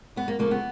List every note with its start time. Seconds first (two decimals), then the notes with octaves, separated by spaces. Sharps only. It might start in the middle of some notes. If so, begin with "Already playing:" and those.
0.16 F#2 B3
0.28 A#3
0.39 C#3 F3 A3 A#3
0.51 B3